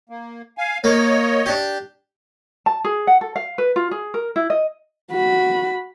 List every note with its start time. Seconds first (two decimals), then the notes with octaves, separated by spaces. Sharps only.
0.10 A#3
0.58 F5 G#5
0.84 A#3 C#5 D#5
1.46 D4 G4
2.66 A5
2.85 G#4
3.07 F#5
3.21 A4
3.36 F5
3.58 B4
3.76 F4
3.91 G#4
4.14 A#4
4.36 E4
4.50 D#5
5.12 F#4 B5